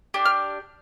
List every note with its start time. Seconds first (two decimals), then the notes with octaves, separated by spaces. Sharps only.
0.14 D4 G4
0.25 F6